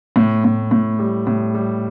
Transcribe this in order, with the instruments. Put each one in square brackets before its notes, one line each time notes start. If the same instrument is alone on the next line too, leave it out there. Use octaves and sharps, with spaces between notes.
[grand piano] A2
A2
A2
G3
A2
G3